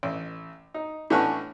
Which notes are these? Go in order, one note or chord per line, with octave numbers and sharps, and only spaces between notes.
A1
D#4
A2 E3 C#4 D4 F#5 C#6